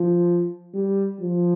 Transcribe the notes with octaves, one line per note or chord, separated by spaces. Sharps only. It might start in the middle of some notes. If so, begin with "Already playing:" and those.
Already playing: F3
G3
F3